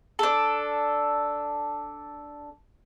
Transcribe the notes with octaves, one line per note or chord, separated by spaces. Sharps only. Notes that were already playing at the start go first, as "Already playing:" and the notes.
D4 A4